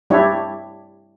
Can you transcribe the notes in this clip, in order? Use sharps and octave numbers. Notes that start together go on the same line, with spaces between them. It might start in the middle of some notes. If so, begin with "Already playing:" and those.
G3 D4 E4 G4 C#5